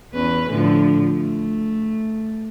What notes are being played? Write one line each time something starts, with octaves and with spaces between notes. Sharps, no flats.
E2 C#4 B4
A2 D3 F3
A3